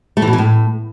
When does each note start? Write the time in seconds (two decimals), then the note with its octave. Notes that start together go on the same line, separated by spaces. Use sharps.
0.17 A3
0.22 E3
0.28 B2
0.33 E3
0.38 A2